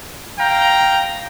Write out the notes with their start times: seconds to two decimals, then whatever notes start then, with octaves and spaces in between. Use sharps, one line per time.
0.39 F5 G5 A#5